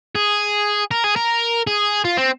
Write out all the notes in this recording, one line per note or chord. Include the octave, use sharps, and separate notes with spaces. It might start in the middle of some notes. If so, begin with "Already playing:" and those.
G#4
A#4
G#4
A#4
G#4
F4
C4